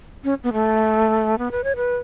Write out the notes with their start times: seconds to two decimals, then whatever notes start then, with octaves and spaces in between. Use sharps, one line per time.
0.24 C#4
0.44 B3
0.53 A3
1.38 B3
1.51 B4
1.64 C#5
1.76 B4